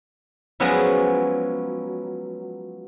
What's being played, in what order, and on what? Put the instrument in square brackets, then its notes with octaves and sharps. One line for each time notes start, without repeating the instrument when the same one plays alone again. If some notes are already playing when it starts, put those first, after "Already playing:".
[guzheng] F3 F#3 G#3 B3 C#4 E4